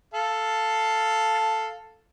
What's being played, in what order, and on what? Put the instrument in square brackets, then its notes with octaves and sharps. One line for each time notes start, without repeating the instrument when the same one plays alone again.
[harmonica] A4 F5 A5